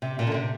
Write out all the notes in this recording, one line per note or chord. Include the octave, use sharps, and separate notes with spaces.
C3
A#2
D3
C3